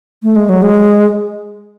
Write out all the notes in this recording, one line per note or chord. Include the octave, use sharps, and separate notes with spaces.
A3
G#3
F#3
G#3